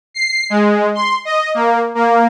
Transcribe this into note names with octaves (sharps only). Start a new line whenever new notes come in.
C7
G#3
C6
D#5
A#3
A#3